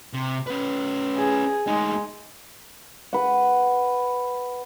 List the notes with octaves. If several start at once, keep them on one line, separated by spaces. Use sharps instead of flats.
C3
C#4 B4
G#4
D2 G#3 D#4
B4 F#5